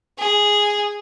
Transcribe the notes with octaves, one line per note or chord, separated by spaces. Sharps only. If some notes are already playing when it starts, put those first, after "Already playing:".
G#4